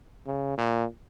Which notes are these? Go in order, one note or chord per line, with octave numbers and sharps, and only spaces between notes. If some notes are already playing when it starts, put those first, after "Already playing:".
C#3
A#2